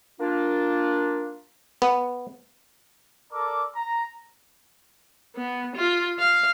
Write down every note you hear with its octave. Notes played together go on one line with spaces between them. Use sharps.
A#3 D4 F4
B3
A4 A#4 D5 D6
A#5
B3
F4
F5